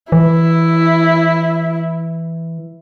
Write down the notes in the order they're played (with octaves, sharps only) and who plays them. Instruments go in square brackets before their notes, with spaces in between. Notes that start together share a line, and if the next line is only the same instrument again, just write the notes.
[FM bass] E3 [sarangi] E4